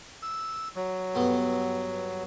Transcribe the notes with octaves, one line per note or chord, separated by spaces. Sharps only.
E6
F#3
G2 B3 A4